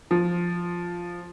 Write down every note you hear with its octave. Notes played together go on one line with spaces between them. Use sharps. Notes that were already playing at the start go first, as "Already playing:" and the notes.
F3